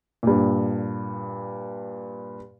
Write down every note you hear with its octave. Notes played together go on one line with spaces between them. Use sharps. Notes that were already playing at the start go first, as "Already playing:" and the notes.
G2 A#2